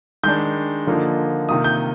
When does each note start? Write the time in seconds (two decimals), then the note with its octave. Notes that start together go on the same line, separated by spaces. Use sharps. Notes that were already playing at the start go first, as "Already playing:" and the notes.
0.24 D#3 G#3 D4 G6
0.87 D3 F3 A#3 D#4
1.49 C3 D#3 A#3 F4 D#6
1.64 G6